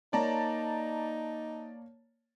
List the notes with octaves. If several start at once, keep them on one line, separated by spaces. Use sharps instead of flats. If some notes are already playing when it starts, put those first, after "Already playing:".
A#3 D#4 C#5 D5 A5 A#5